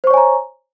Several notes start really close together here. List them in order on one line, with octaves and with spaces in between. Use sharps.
C5 C#6 C#5 G#5 A#5